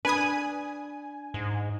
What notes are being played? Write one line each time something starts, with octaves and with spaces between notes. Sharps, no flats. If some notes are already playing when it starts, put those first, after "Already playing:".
D4 B4 G#5 D#6
G#2